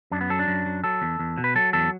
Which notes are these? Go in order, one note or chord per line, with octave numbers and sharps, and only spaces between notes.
F#2 D4
B3
F#3 A4
D4
F#2
F#3
F#3 A4
E2
E2
B2
B4
F#3 A4
E2 A4